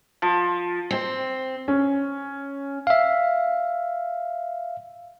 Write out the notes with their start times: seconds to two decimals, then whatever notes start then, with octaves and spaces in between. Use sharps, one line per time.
0.22 F3
0.91 C4
1.68 C#4
2.87 E5 F5